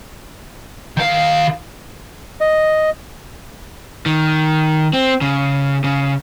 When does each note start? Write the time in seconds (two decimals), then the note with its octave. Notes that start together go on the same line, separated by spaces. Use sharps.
0.97 D#3 F5
2.40 D#5
4.06 D#3
4.93 C4
5.21 C#3
5.84 C#3